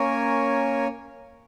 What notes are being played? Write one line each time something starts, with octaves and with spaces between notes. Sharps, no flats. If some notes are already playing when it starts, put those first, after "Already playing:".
Already playing: A#3 C#4 A#4 C#5 G#5